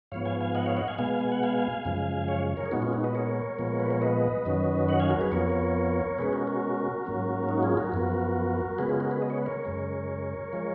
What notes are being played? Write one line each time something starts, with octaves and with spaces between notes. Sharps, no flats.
G#2 F3 B3 C#5 F5
F5 G#5
F5 G#5
D#5 F#5
C#5 F5
D#5 F#5
F5 G#5
B2 G#3 B3 F5 G#5
G#5
F#5
F5 G#5
F#2 C#3 F3 G#3
C#5 F5
A#4 C#5
G#4
A#2 G#3 B3 D#4 F#4
C#4 F4
D#4 F#4
B4 D#5
A#4 C#5
A#2 F3 G#3 B3
B4
C#5
B4 D#5
F#2 D#3 F#3 C#4
D#5 F#5
F5 G#5
F#4 A#4
G#4 B4
F2 F3 B3 A#4 C#5
B2 G#3 C#4 G#4 B4
F#4 A#4
F#4 A#4
G#2 F#3 A#3 C#4
D#4 F#4
F4 G#4
F#4 A#4
F#2 F3 B3
C#3 G#3 B3 G#4 B4
F4 G#4
F#4 A#4
G#4 B4
D#5
C#5
B4
A#4 C#5
F#2 C#3 G#3
F3 G#3